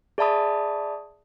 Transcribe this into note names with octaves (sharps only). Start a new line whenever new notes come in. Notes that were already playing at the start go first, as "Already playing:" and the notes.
G#4 D5 E5 A5 B5 D#6